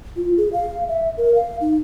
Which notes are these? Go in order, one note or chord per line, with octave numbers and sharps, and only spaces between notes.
F4
G#4
F5
E5
A#4
F5
D#4